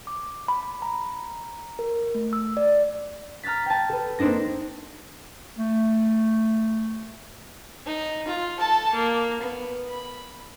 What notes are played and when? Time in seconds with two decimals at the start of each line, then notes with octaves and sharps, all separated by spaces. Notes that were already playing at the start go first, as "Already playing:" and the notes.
0.07 D6
0.48 B5
0.82 A#5
1.79 A#4
2.15 A3
2.33 E6
2.57 D5
3.43 A#5 F6 F#6 A6 B6
3.66 G5 A5
3.89 A4 B4
4.19 A#3 C4 D4 D#4 A#6
5.58 A3
7.86 D#4
8.28 F4
8.60 A4 A5
8.93 A#3
9.41 B3
9.90 B5